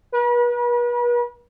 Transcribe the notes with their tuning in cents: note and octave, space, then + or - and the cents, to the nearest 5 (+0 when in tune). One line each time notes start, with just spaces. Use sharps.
B4 -40